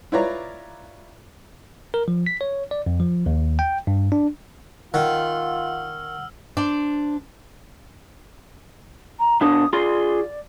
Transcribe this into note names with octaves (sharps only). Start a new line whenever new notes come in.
E4 F4 B4 C#5 D5 A#5
A#4
F3
B6
C#5
D5
F2
F3
D#2
G5
G2
D4
D#3 F4 F#5 E6 F6
D4 C5 D5
A#5
B2 D4 D#6
F4 G#4 D5 C6